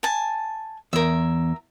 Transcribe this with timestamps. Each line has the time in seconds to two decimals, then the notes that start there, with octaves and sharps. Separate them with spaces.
0.03 G#5 A5
0.93 E2 A#4 E5